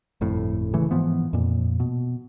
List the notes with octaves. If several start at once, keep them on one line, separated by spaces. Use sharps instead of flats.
G1 F2 A2
G#1 C#3 E3 A3
G#2 E3 F3 B3
F2 A#2
B2